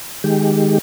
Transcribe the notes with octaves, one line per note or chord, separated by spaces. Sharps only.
D#3 G#3 G4